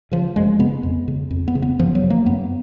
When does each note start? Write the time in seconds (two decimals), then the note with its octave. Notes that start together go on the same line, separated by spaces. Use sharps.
0.11 C#3 F3
0.36 F#2 G#3
0.59 C#3 B3
0.83 F2
1.08 C#3
1.31 F2
1.48 B3
1.55 C#3
1.62 B3
1.79 F#2 F3
1.95 F#3
2.03 C#3
2.10 A#3
2.26 F#2 B3